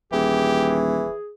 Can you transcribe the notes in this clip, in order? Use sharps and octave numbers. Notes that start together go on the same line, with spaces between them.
D#1 E3 G4 G#4